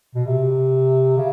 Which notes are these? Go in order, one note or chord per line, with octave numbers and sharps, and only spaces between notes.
B2
C3
C#3